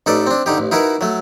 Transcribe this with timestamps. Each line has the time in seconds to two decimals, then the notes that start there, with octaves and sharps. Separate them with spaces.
0.06 A1 D#4 A4 B4 D5
0.27 C4 D4
0.46 D3 D#4 G4
0.58 A1
0.72 D#4 E4 F#4 A#4 B4
1.01 F#3 A3